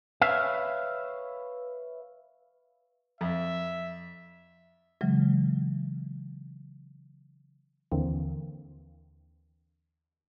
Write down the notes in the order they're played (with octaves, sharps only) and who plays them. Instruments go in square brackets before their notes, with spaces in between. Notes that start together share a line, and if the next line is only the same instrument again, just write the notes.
[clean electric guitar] B4 C#5 E5 F5
[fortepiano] F2 [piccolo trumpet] E5
[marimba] C#3 E3 F#3 G#3
[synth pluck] D#2 D3 E3 A#3 C4